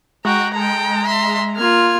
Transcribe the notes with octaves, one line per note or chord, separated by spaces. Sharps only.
G#3 F#4 G5 A#5
A4 G5 A#5
E5 C6
A#3 F4 F6 G#6